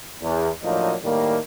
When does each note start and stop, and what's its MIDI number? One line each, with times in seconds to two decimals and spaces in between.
0.22 0.50 40
0.63 0.94 45
0.63 0.94 53
0.63 0.94 54
0.63 0.94 58
0.63 0.94 62
0.63 0.94 63
1.04 1.37 45
1.04 1.37 51
1.04 1.37 55
1.04 1.37 58